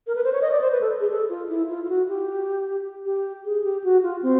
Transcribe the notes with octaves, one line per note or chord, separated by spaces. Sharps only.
A#4
B4
C5
C#5
D#5
D5
C5
B4
A4
G#4
A4
F4
E4
F4
F4
F#4
G4
G4
G#4
G4
F#4
F4
C4